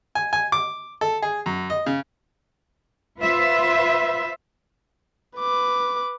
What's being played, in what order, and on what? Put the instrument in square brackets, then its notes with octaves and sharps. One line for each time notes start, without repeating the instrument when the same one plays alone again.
[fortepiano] G#5
G#5
D6
A4
G#4
F#2
D#5
C#3
[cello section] F4 B4 C5 E5
[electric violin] B4 D6